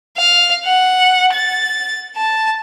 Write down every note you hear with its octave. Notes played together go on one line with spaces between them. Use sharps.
F5
F#5
A6
A5